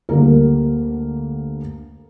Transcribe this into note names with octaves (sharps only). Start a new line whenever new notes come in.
D2 D3 G3 A#3 A#4